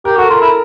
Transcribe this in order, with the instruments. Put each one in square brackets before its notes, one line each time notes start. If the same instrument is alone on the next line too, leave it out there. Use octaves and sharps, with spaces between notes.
[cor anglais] G4 [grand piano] A#4
[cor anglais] F#4 [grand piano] A4
[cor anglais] F4 [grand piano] A#4
[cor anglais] E4